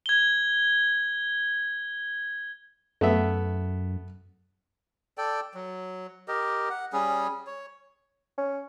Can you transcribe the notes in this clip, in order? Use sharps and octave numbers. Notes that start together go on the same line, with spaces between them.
G#6 G7
F#2 A3 B3 E5
A4 D5 G5
F#3
G4 A#4 D#5
F#5
G3 C#4 G#4
C#5
C#4